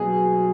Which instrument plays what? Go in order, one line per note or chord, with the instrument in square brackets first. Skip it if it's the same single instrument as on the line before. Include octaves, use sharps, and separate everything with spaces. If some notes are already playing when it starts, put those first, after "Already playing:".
Already playing: [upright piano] B2 F#3 G#4